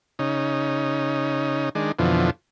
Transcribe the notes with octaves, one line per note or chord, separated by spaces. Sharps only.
C#3 D#4
D#3 G#3 D4
F2 B2 D3 E3 F3